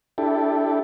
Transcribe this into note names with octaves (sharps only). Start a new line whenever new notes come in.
D4 E4 G4 A4